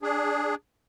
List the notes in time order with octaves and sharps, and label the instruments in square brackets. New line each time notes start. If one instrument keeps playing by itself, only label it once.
[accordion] D4 G#4